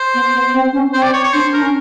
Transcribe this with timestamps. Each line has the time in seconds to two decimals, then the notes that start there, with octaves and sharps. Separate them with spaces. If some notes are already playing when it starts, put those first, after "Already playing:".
Already playing: C5
0.14 B3
0.34 B3
0.53 C4
0.73 C#4
0.93 C4 C5
1.03 D5
1.13 C#5
1.24 C#5
1.33 D4 C5
1.53 D4 A#4
1.63 C#4